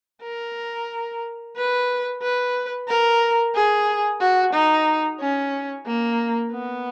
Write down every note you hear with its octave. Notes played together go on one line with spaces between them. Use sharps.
A#4
B4
B4
A#4
G#4
F#4
D#4
C#4
A#3
B3